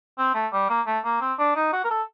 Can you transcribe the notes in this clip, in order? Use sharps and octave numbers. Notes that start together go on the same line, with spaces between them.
C4
A3
G3
A#3
A3
A#3
C4
D4
D#4
F#4
A#4
A4